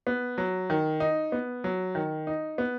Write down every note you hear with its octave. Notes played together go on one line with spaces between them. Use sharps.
B3
F#3
D#3
D#4
B3
F#3
D#3
D#4
B3